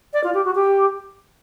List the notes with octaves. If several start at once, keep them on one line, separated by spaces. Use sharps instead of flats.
D5
F4
G4
F#4
G4